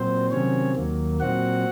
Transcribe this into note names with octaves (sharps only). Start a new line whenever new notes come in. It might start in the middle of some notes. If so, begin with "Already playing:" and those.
Already playing: A#2 F#3 C4 C5
C3 D#3 F#3 C4 C#4 C#5
D#2 D#3 F#3 A#3
A#2 F#3 C4 F#4 F#5